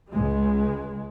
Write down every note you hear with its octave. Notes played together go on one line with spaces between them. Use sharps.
C#2 G#3